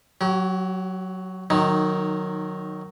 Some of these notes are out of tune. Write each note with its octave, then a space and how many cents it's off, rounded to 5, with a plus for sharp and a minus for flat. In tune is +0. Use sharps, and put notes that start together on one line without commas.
F#3 +5 G4 -40
D#3 -20 F#3 +0 D#4 +0